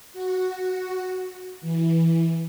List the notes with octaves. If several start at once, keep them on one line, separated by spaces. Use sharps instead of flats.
F#4
E3